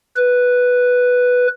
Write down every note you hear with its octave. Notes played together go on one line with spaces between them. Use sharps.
B4